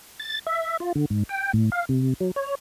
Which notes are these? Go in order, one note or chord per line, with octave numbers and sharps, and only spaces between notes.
A6
E5
F4
D3
G#2
G5
A2
F5
C3
F#3
C#5